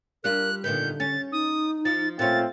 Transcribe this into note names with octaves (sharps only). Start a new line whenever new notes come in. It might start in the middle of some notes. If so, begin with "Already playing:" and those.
G3 D4 F4 A#4 F#6
A#2 D3 D#3 B3 G6
C#4 A6
D#4 D#6
F3 A6
A#2 A3 C4 C#4 F4 A6